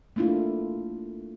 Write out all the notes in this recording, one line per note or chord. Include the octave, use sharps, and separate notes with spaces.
A3 A#3 D4 E4 F4